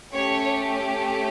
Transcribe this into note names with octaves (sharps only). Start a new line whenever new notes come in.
A3 C#4 G4 C#5